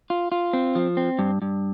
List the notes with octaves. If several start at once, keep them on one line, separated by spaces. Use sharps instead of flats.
F4
F4
C4
F3
C4
G2
G2